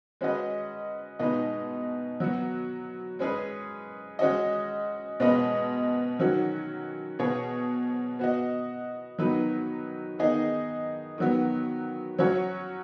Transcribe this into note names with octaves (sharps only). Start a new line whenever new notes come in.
G#3 C#4 F#4 B4 D#5
B2 G#3 D#4 B4 D#5
F#3 B3 F#4
G#3 C#4 G#4 B4
G#3 C#4 F#4 D#5
B2 G#3 C#4 B4 D#5
D#3 F#3 C#4 F#4
B2 B3 G#4 C#5
B3 F#4 D#5
D#3 F#3 B3 D#4 B4
D#3 B3 D#4 G#4 D#5
D#3 F#3 B3
F#3 C#4 F#4 C#5